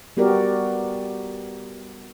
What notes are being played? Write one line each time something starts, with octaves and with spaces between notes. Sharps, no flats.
G3 B3 F#4 G4 A#4 D5